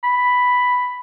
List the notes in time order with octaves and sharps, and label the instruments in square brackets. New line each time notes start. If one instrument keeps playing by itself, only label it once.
[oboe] B5